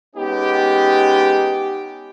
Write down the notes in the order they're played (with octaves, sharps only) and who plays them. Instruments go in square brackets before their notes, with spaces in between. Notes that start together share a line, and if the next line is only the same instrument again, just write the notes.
[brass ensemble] G#3 B3 C#4 D#4 G4